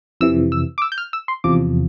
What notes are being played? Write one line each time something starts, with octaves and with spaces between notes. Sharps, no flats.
F2 C3 E3 E6
E6
D6
E6
G6
F6
E6
C6
E2 C3 F3 D6